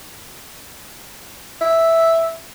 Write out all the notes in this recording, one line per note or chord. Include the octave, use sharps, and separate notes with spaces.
E5